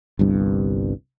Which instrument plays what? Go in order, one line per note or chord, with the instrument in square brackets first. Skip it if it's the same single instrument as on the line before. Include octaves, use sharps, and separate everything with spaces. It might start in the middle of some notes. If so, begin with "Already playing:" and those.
[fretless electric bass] G1 C2 G2